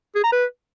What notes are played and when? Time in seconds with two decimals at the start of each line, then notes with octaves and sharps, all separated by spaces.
0.15 G#4
0.24 A#5
0.32 B4